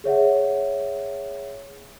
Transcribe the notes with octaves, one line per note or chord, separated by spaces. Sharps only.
G#4 C#5 E5 F#5